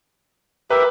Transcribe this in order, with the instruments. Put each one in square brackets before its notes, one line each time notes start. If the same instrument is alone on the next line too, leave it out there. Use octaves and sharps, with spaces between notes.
[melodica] G4 A#4 E5 [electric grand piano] B4